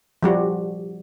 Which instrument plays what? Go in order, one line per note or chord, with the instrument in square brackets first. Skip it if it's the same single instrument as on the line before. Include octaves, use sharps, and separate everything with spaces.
[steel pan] F3 G3 F#4